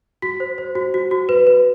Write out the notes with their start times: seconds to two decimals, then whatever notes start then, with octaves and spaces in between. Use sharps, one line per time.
0.22 F#4 B6
0.40 C5
0.58 C5
0.75 F#4
0.94 F#4
1.11 F#4
1.29 B4
1.47 B4